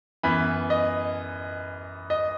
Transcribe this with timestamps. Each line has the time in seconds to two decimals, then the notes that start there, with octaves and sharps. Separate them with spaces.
0.23 F#2 E3 B3 B5
0.70 D#5
2.10 D#5